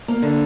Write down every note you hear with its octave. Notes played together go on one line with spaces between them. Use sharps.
A#3
D3